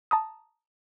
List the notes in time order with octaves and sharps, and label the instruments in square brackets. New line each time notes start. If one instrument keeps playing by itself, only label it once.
[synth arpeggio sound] A5 A#5 D#6